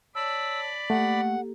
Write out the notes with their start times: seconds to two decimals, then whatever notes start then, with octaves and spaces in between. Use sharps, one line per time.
0.15 C#5 D5 A5 B5 E6
0.90 A3 A#3 G4 A4 F#5